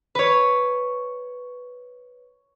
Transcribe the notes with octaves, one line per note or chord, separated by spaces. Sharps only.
B4 C#5